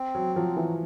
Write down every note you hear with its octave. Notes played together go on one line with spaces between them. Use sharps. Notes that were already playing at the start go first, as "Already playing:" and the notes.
Already playing: C4
F#3
F3 F#3
E3